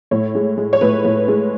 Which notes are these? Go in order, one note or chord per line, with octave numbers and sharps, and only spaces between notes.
A2 C#5
G#3
G#3
C#5
A2 B4
A2
G#3